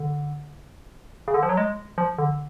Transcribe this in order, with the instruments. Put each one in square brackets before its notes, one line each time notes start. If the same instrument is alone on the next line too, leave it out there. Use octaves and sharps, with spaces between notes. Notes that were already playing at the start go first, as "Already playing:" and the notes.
Already playing: [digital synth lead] D3
C#3
D3
F3
F#3
G#3
F3
D3